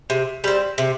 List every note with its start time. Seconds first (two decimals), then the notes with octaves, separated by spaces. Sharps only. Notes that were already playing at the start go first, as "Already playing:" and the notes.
0.10 C3
0.44 G3 C4
0.78 C3